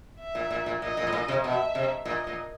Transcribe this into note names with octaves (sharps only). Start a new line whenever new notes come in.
E5
A#2
A#2
A#2
A#2 D#5
A#2
A2
A#2
C3
B2 E5
C3
A#2 D#5
A#2